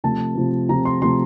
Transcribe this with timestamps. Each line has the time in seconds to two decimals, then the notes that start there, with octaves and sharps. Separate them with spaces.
0.04 C3 F3 A3 A5
0.36 C3 F3 A3
0.69 C3 F3 A3 A#5
0.85 C6
1.02 C3 F3 A3 C6